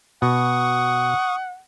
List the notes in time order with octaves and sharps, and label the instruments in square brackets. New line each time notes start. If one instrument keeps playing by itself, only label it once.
[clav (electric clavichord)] B2 [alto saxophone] F#5 [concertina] C#6 D#6